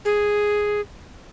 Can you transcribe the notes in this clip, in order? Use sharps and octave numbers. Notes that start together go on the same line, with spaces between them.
G#4